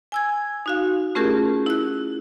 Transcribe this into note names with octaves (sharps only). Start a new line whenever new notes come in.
G#5 E6 G#6
D#4 F#4 F5
A3 C#4 F4 G4 G#4 A#4
E4 F#6